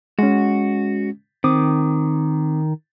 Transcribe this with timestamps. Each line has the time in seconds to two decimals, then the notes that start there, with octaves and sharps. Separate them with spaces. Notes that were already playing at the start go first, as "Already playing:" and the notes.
0.19 G#3 C#4 F#4
1.44 D#3 C4 D6 D#6